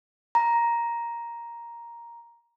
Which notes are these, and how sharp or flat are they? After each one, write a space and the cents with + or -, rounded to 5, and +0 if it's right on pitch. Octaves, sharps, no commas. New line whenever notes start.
A#5 +5